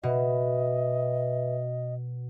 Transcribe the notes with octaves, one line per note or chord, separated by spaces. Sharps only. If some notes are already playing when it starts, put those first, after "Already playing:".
B2 B4 D#5 E5